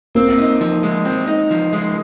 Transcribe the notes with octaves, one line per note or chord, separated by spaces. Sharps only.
A#3 C4
D#4
F3
G#3
C4
D#4
F3
G#3